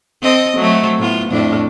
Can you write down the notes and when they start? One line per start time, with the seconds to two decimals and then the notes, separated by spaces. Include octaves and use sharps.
0.22 C4 A4 D#5
0.57 F#3 A3 C4
0.98 A2 B3 F4
1.30 F2 A2 D4